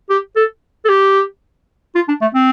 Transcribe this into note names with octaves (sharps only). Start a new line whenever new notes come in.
G4
A4
A4
G4
F4
D4
A3
C4